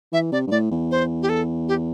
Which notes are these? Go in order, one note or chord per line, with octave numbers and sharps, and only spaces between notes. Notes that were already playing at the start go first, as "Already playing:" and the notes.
E3 E5
C3 D5
G2
A2 D5
E2
C5
G4
A4
G4